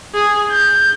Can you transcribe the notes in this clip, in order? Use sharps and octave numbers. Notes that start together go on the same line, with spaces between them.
G#4
G6